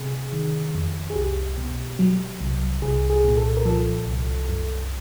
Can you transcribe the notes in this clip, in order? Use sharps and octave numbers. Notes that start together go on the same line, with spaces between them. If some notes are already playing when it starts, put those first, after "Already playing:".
Already playing: C3 G#4
D#3
F2
G#4
C2 G4
B2
F#3
C2
C2 G#4
G#4
A#2
A4
A#4
F3 A4
C2
F#2